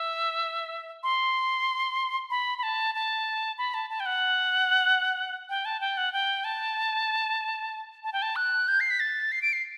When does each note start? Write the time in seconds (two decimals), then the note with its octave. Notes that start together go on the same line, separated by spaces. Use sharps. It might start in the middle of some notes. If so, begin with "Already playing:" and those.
Already playing: E5
1.03 C6
2.30 B5
2.58 B5
2.63 A5
2.95 A5
3.58 B5
3.74 A5
3.90 A5
4.00 G5
4.06 F#5
5.49 G5
5.65 A5
5.81 G5
5.97 F#5
6.13 G5
6.44 A5
8.04 A5
8.13 G5
8.22 A5
8.36 F#6
8.68 G6
8.80 C7
8.90 B6
9.00 A6
9.32 C7
9.42 D7
9.53 C7